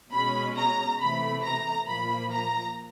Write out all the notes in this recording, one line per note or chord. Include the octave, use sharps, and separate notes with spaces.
B2 G#3 C#4 B5
A#5
C3 E3 A3 B5
A#5
A#2 F3 A#3 B5
A#5